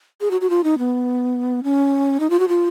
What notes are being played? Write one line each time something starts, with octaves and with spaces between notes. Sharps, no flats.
G#4
F#4
F#4
F4
D#4
B3
C#4
D#4
F4
F#4
F4